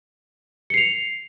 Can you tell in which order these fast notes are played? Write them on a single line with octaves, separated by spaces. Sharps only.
C#7 C7 F7